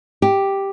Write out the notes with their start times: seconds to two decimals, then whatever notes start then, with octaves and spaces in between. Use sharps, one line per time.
0.22 G4